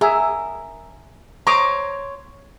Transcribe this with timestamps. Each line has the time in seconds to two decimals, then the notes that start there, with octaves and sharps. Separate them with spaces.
0.01 G#4 A#4 E5
1.47 C5 C#5 A#5 D6 D#6